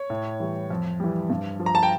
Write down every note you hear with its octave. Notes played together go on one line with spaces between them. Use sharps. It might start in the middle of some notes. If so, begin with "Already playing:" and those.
Already playing: C#5
A2
E3 G3
F2
E3 G3
G2
F3
A#5
A5
G5